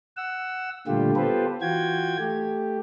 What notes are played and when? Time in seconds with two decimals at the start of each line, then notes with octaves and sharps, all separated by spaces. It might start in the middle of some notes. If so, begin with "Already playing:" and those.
0.17 F#5 E6
0.87 A#2 D3 G3 A3 F4 G4
1.16 B3 F4 G4 A4 B4 C5
1.61 E3 F4 F#4 G5 G#6
2.19 A3 G4